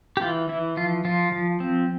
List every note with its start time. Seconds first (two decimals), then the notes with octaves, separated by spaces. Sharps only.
0.17 G4
0.21 E3 F4
0.49 E3 E4
0.77 F3 F4
1.05 F3 F4
1.32 F3
1.60 C4